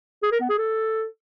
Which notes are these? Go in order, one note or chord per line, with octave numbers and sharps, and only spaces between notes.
G#4
A#4
B3
G#4
A4